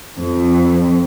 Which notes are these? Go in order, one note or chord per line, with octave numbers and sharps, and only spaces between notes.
F2